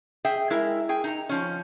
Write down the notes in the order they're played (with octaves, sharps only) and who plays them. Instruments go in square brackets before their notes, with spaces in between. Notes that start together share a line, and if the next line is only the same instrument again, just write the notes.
[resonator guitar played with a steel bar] G#4 E5 G5
G#3 E4 A#4
G#4 G5
D#4 A#5
F3 C#4